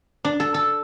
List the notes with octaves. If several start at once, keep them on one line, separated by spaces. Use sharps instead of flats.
D4
A4
A4